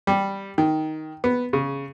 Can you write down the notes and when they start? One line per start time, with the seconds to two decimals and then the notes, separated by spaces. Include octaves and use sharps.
0.07 G3
0.58 D#3
1.24 B3
1.53 C#3